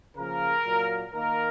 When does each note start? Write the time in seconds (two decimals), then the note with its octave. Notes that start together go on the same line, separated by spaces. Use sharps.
0.16 C#3 F3 A#3 A#4
0.65 A#2 F#3 A#3
1.13 D#3 A#3 A#4